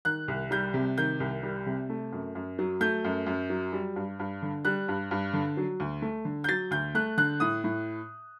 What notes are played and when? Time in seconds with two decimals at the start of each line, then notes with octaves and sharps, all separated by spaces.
0.05 D#3 F#6
0.28 C2
0.51 G3 G6
0.74 C3
0.98 D#3 G6
1.20 C2
1.43 G3
1.66 C3
1.89 A3
2.12 F#2
2.35 F#2
2.59 F#3
2.80 A3 G6
3.04 F#2
3.26 F#2
3.50 F#3
3.73 G3
3.96 G2
4.19 G2
4.42 D3
4.65 G3 F#6
4.88 G2
5.11 G2
5.34 D3
5.57 F#3
5.80 D2
6.02 A3
6.25 D3
6.44 G6
6.49 F#3 A6
6.71 D2 G6
6.95 A3 F#6
7.18 D3 F#6
7.40 A2 D#6
7.64 A2